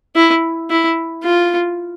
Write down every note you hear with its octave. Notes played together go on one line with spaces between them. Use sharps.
E4
E4
F4